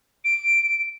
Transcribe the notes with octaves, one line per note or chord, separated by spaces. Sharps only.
D7